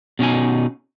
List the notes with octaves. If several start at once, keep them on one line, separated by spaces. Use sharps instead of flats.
B2 C#4 D#4 G#5